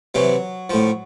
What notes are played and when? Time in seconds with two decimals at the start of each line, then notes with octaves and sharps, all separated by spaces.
0.15 C3 E3 F#3
0.70 A2 F3